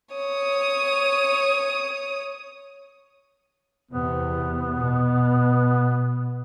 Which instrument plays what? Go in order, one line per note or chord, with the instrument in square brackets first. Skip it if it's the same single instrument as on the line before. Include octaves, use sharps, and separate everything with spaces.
[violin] C#5 D#6
[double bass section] E2 C3 [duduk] B3
[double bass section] B2